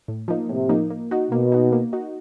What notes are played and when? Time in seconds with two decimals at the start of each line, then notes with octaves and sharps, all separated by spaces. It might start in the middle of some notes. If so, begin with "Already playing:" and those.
0.08 A2
0.28 F3 A#3 D#4
0.49 A2 C3
0.69 F3 A#3 D#4
0.90 A#3
1.11 D#4 F#4
1.31 B2 A#3
1.52 D#4 F#4
1.72 A#3
1.93 D#4 F#4